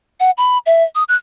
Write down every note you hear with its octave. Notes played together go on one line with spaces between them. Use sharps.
F#5
B5
E5
D#6
F#6